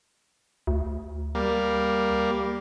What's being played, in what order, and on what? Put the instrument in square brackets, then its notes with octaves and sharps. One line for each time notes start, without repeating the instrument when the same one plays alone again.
[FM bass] D2
[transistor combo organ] G3 A#3